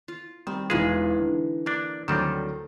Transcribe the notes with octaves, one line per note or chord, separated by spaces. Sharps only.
F4
D#3 G3 C4
E1 E3 G#3 D#4 F4 G#4 B4
D3
A#3 D4 D5
D2 D#3 F#3 G3 C4 A4 D6